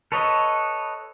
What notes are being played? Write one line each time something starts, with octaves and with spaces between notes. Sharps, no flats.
A4 B4 C#5 D#5